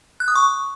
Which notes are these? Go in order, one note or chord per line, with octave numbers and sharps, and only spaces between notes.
F#6
D#6
C#6